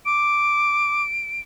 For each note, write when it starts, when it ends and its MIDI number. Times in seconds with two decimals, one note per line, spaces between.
0.05 1.02 86
0.05 1.41 98